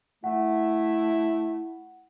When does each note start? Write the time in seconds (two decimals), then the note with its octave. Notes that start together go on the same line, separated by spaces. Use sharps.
0.24 A3 E4 F#5